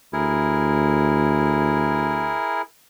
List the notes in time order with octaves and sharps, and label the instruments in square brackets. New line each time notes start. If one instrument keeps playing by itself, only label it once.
[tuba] D2 [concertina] E4 G#4 A#4